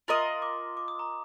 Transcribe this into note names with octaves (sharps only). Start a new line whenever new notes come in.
F4 A#4 D#5 C6
D6
D6
D#6
A#5